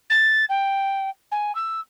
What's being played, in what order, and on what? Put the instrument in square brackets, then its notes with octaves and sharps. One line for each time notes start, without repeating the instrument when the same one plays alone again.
[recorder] A6
G5
G#5
E6